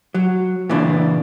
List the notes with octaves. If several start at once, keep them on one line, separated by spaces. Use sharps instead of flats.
F#3
A#2 C#3 E3 D4